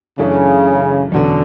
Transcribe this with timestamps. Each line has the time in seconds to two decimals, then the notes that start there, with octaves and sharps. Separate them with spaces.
0.18 F#2 C#3 E3 A3 D4
1.12 E2 B2 D3 F#3 C#4